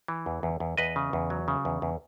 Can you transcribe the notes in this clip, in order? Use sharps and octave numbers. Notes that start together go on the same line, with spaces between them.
E3
E2
E2
E2
E2 B4 D#5
C#3
E2
F#3
C#3
E2
E2